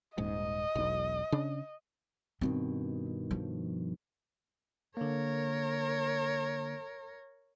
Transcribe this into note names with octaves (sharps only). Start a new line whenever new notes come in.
D#1 G#2 D#5
E1 B1
C#3 D4
G2 B2 D#3 C4
F3
D3 A#3 A#4 C#5